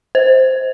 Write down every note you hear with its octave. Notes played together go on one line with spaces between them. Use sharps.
C5